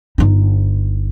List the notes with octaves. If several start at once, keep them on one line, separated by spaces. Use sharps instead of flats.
G1 D#4